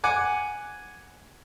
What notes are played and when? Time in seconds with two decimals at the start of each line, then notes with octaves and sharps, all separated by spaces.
0.04 F#5 G#5 D6